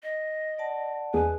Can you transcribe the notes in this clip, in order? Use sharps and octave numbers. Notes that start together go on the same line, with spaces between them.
D#5
D5 F#5 A5
E2 G#4 B4